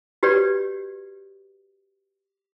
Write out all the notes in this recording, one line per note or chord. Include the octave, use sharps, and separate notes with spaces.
F#4 G4 B4 C#5 D5